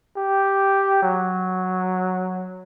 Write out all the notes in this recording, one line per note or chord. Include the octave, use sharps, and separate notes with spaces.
G4
F#3